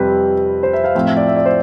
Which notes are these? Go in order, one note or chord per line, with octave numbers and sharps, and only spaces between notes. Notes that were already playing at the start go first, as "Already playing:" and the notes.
Already playing: F2 C3 G3 C4 B4
C5
E5
F5
A2 F3 C4 F5
E5
D5
E5
D5
C5